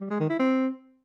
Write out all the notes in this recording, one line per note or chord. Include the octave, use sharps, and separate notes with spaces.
G3
G#3
D#3
E4
C4